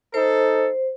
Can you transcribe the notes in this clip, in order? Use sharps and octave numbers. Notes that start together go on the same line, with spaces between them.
D#4 A4 C5